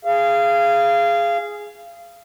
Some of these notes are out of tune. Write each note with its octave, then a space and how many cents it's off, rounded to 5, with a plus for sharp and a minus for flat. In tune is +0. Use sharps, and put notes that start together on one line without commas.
G#4 +0 F5 -25